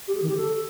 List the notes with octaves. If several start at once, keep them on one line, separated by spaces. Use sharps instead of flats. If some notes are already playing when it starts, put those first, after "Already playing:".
G4
G#4
D#3
G4
A4